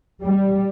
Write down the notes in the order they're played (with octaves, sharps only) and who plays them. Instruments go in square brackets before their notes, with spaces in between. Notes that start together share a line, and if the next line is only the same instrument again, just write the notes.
[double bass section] G3